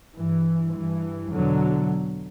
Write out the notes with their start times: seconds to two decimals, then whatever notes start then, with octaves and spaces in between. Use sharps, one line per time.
0.16 G2 E3
0.74 G2 E3
1.32 E2 B2 D3 F#3